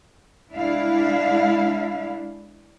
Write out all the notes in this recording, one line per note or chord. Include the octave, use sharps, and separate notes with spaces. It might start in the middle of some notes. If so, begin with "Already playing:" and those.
G#3 D4 E4 F5